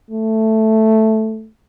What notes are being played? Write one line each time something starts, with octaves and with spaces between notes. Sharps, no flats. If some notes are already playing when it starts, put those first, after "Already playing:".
A3